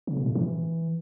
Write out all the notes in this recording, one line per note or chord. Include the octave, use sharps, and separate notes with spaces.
C#3
B2
A2
E3